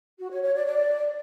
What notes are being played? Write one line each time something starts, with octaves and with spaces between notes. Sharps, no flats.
F#4
C#5
C#5
D5
D5